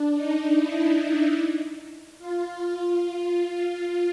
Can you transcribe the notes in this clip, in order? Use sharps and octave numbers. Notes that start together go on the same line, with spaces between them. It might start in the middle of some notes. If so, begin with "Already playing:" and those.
Already playing: D4
D#4
E4
F4